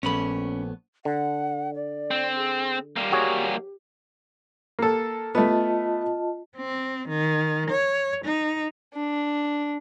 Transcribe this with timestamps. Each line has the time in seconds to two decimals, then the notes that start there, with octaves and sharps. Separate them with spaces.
0.03 A#1 A3 B3 C#4 C#5 B5
1.05 D3 F#5
1.75 D5
2.11 C4
2.36 G#4
2.96 G3 A#3 G4
3.12 F#4 G#4 C#5
4.79 A#3 A4
5.35 A3 B3 F4 D#5 A5
6.57 C4
7.09 D#3
7.70 C#5
8.25 D#4
8.94 D4